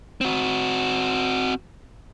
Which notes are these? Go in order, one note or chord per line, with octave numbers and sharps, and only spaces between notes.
C4 F#4